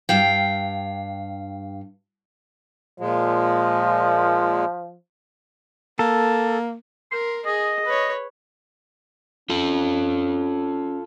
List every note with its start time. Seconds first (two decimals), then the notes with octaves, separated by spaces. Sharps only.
0.09 G2 F5 G5
3.00 A#2 F3 G#3
5.99 A#3 A4
7.12 A#4 C6
7.45 G#4 D#5
7.85 B4 C#5
9.50 C#4 F4 A4